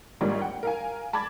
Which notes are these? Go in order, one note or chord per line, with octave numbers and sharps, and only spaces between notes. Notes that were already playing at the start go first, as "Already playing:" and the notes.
G#1 G#2 G3 A#3 F4 C#5
F#5 G5
A#4 F5 G#5
A5 B5 D6 G#6 A6